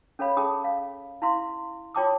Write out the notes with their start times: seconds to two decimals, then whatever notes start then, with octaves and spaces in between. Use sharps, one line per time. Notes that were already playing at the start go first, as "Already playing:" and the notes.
0.19 C#4 A4 C#5 F5 B5
0.37 C#4 G#4 A5 D#6
0.64 F5
1.22 E4 F5 C6
1.95 F4 C#5 G5 A5 D6 D#6